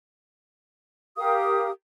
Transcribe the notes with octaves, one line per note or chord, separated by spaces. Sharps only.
G4 A#4 F5 D#6